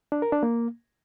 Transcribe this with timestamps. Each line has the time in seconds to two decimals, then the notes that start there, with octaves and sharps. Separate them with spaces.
0.12 D4
0.22 A#4
0.32 D4
0.43 A#3